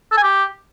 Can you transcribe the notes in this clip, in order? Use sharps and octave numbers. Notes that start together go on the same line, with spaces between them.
A4
G#5
G4